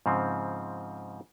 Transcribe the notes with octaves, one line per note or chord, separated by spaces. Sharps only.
G#2 C#3 F3 C4